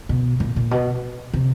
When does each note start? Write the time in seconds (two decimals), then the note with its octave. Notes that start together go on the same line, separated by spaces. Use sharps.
0.09 B2
0.40 A#2
0.56 A#2
0.71 B2
1.34 C3